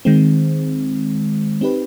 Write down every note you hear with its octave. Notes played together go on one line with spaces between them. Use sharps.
D#3 G#3 C4
C4 D#4 G4 B4